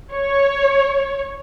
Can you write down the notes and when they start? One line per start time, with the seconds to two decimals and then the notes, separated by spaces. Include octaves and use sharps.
0.12 C#5